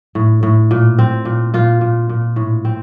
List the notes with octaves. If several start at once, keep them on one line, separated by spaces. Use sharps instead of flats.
A2
A2
A#2
C4
A#2
A#2 F4
A#2
A#2
A2
C4